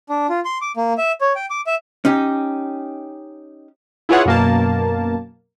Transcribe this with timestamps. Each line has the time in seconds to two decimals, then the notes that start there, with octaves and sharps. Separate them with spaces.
0.10 D4
0.29 F4
0.45 C6
0.61 D6
0.77 A#3
0.98 E5
1.21 C#5
1.36 G5
1.50 D6
1.67 E5
2.05 C#4 D#4 G4
4.09 E4 F4 G#4 B4 C#5 F#5
4.25 F#2 B2 A#3 A#4 A5